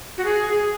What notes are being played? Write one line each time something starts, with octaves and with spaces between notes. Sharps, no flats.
F#4
G#4
G#4